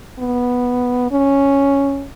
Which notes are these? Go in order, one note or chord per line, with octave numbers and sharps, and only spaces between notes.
B3
C#4